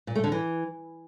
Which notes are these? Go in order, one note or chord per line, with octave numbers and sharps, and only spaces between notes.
A#2
A3
D3
E3